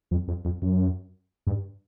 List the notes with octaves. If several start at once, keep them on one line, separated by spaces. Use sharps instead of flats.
F2
F2
F2
F#2
G2